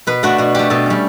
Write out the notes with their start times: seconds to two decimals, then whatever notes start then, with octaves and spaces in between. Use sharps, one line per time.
0.07 B2 B4
0.23 A3 D4 F#4
0.38 B2 F#4
0.54 A3 D4 G4
0.70 B2 A4
0.86 G3 C#4